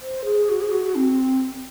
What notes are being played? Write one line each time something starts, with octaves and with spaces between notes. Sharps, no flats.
C5
G#4
F#4
G#4
F#4
F#4
C4